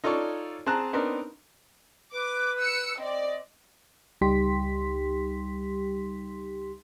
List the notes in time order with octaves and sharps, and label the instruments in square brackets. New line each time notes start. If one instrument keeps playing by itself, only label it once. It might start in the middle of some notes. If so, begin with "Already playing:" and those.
[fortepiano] D#4 F4 A4 C#5 D5 C#6
C4 G#4 A5 A#5 F#6
B3 C4 D4 D#4 A#4
[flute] B4 [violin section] D6
[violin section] E6 C#7
[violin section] C4 D5 [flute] D#5
[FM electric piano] C#2 G3 D#4 G4 C6 B6